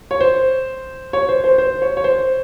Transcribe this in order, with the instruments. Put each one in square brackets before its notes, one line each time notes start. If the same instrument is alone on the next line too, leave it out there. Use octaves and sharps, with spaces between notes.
[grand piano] C#5
C5
C#5
C5
C5
C5
C#5
C#5
C5